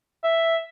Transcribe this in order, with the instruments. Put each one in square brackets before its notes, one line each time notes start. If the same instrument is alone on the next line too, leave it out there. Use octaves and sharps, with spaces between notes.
[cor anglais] E5